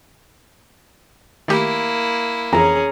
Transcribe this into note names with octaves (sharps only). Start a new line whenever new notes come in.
D#3 A3 A#3 E4 G4
F2 E3 C#4 G#4 A#5